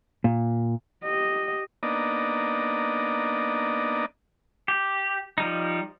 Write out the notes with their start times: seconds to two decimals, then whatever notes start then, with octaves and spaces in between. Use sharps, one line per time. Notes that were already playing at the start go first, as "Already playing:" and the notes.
0.24 A#2
1.04 G4 D#5
1.83 A#3 B3 D4 D#4 D5 D#5
4.68 G4
5.38 F3 G3 D#4